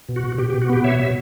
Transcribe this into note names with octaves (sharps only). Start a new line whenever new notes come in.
B2
F#4
B2
B2 G4
G4
B2
F#4
B3 G4
B2 C#5 E5
B2 E5